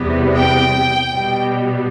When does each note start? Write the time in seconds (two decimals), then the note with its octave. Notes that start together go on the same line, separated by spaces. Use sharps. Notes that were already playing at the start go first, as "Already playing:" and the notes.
Already playing: E2 C3 G3 B3
0.37 G5
1.09 B2 G3 B3